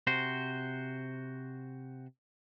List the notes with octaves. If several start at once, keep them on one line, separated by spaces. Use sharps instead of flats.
C3 F#4 C5